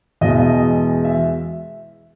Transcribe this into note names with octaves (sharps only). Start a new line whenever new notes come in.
E2 B2 G#3 D#5
E5
D#5
E5